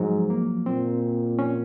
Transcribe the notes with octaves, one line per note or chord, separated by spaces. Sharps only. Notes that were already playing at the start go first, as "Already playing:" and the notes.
Already playing: G#2 F3 F#3
A#3
A#2 C4
C#4